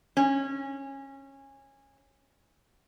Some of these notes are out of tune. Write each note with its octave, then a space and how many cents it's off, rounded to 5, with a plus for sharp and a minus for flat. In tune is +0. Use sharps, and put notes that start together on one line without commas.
C#4 -20